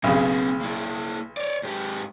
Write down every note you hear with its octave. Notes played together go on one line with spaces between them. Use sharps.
B1 C#3 A#3 C4
A#3 E4
C#5 D5
G#2 G4